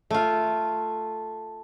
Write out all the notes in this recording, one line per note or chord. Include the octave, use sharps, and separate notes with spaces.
A3 F4